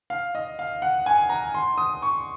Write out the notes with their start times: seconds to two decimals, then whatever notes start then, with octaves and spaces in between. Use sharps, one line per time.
0.10 F5
0.35 D#5
0.59 F5
0.82 F#5
1.06 G#5
1.29 A#5
1.55 C6
1.78 D#6
2.02 C#6